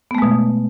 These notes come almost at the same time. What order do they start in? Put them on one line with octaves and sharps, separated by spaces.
B3 A3 G#3 B2